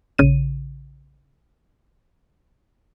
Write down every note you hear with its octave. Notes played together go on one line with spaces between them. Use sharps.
A#1 C#3 D#7